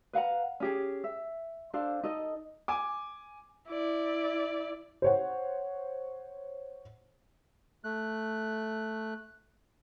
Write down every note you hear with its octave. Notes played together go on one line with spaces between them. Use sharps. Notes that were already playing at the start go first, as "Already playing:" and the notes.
B4 F5 F#5 A#5
C#4 G4 G#4
E5
D4 A4 C5 F5
D#4 A4 D#5
G#5 D6
E4 D5
C5 C#5 F#5
A3 F#6